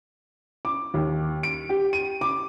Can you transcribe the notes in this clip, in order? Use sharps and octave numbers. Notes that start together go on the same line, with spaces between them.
D6
D#2
D7
G4
D#7
D6